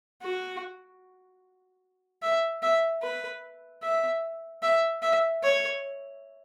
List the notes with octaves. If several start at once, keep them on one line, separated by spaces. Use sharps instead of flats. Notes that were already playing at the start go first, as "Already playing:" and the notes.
F#4
E5
E5
B4
E5
E5
E5
C#5